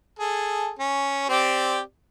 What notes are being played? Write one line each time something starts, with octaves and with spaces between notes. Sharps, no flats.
G#4 A4
C#4
C4 G4 D5